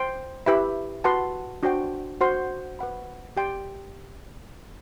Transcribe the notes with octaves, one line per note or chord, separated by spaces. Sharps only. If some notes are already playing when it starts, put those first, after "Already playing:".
Already playing: C5 G5 C6
E4 G4 B4 E5 B5
F#4 B4 F#5 A5 C6
D4 F#4 C5 G5
F#4 C5 F#5 C6
B4 F#5 B5
G4 D5 G5 C6